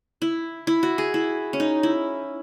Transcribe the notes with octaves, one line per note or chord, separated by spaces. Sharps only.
E4
E4
F#4
G#4
E4
C#4
D#4
E4